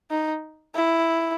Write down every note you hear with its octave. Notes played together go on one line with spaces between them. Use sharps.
D#4
E4